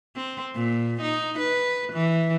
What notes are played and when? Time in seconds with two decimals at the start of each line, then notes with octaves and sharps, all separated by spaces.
0.16 C4
0.55 A#2
1.01 D#4
1.39 B4
1.93 E3